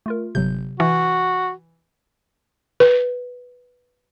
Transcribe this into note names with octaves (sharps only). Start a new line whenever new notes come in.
A3 F4 A#4
G1 C3 F#3 G6
E3 F#4
B4